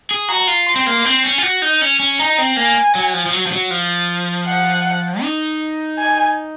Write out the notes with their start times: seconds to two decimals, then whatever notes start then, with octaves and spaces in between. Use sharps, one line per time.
0.11 G#4
0.29 F#4 A#5
0.47 F4
0.67 C6
0.76 C4
0.87 A#3
1.05 C4
1.24 C#4
1.38 F4
1.43 F#4
1.62 D#4
1.81 C#4
1.99 C#4
2.19 D#4 A#5
2.38 C4
2.57 A#3 G#5
2.95 F#3
3.14 F3
3.26 F3
3.33 F#3
3.47 F3
3.52 F#3
3.71 F3
4.46 F#5
5.22 D#4
5.98 G#5